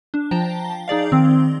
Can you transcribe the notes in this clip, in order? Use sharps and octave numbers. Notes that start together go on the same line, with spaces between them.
D4
F3 G5 A5 A#5
D#4 G#4 D5 F5
D#3 C4